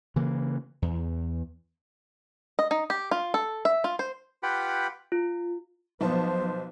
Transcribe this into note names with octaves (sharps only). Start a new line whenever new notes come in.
C#3 E3 A#3
E2
D#5
D#4
G4
F4
A4
E5
F4
C5
F4 G4 B4 F#5 G5 B5
F4
B1 F3 B3 C5 A5